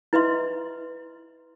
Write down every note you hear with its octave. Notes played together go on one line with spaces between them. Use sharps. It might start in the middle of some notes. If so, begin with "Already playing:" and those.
E4 B4 D#5 E5 C6